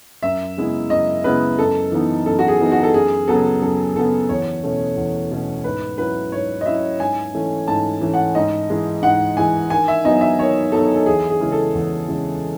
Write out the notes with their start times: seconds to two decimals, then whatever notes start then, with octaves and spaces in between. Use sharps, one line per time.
0.23 F#2 E5
0.57 C#3 G#3 B3 E4
0.90 F#2 D#5
1.24 C#3 G#3 B3 E4 B4
1.59 F#2 A4
1.92 E3 B3 D#4
2.26 F#2 A4
2.39 F#4
2.48 G#4
2.59 E3 B3 D#4
2.72 F#4
2.83 A4
2.93 F#2 G#4
3.28 C#3 F#3 B3 A4
3.62 F#2 A4
3.96 C#3 F#3 B3 A4
4.29 E2 C#5
4.64 B2 A3 C#4
4.96 E2
5.31 B2 A3 C#4
5.64 G#2 B4
5.98 F#3 C#4 E4 B4
6.32 G#2 C#5
6.61 D#5
6.66 F#3 C#4 E4 E5
7.00 G#2 G#5
7.34 E3 A3 C#4
7.68 G#2 A5
8.01 E3 A3 C#4
8.14 F#5
8.35 G#2 D#5
8.70 E3 G#3
9.03 G#2 F#5
9.37 E3 G#3 G#5
9.70 D#3 G#5
9.88 E5
10.05 F#3 B3 D#4 D#5
10.21 E5
10.38 D#3 C#5
10.72 F#3 B3 D#4 A4
10.96 A4
11.06 E2 G#4
11.30 G#4
11.40 C#3 E3 G#3 C#4
11.52 A4
11.74 E2
12.08 C#3 E3 G#3 C#4